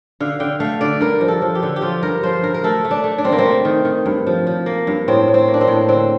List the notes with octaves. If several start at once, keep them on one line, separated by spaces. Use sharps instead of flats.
D3 F5
D3 G5
A3 F5
D3 D5
G2 A#4
F3
A4
F3
G4
D3
G4
F3 F4
G2 A#4
F3 C5
G2 A#4
A#4
A3 A4
A3
D4
A3
D4
G2 C4
A#3
C4
A3
D#3
D#3
G2
F3
F3
A#3
G2
A2 C4
A2
C4
A#3
D4
C4
A2
D3 C4